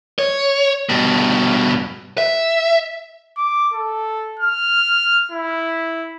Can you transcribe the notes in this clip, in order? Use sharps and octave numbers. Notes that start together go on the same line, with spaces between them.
C#5
G2 B2
E5
D6
A4
F6
E4